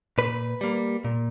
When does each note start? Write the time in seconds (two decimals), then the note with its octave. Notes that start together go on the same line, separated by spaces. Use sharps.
0.18 A#2 B4
0.61 G3 A#3
1.05 A#2